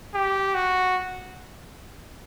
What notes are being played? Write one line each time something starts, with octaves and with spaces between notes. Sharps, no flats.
G4
F#4